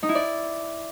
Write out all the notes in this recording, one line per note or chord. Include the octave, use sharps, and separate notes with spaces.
D#4
E4
D5